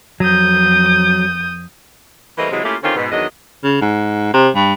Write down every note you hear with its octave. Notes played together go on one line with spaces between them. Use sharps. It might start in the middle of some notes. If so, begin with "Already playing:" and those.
F2 F#3 D#6 G6
E3 G3 A3 A#3 C4 D#5
C3 E3 F#3 G#3
A3 A#3 C#4 E4 F4 G4
D3 D#3 C4 C#4 F4 G4
G#2 B2
E2 D#3 F#3 D4 D#5
C#3
G#2
C3
G2